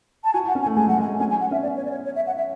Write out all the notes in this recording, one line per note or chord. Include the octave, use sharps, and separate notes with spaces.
A5
F#4 G#5
E4
F#5
C#4
G#5
A3
G#3 G#5
F#3 F#5
G#3
G#5
A3
C#4 G#5
G#5
F#5
C#4 E5
B3 D5
C#5
D5
C#5
C#5
E5
F#5
E5